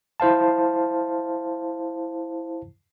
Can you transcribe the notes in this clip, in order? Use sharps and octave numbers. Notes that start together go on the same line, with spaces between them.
E4 C5 F5 A5